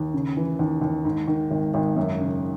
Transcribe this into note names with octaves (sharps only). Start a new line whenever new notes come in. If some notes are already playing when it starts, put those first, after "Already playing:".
Already playing: D#2
C#3
E3
D#2
D#2
G#2
D#3
G#1
G#1
F#2
C#3